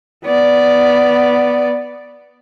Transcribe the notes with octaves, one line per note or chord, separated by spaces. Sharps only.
B3 D5